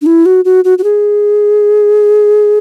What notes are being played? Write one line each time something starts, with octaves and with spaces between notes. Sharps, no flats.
D4
E4
F#4
F#4
F#4
F#4
G#4